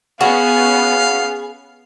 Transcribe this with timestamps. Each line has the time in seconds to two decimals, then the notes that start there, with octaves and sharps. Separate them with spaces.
0.21 B3 C#4 F#4 G#4 F5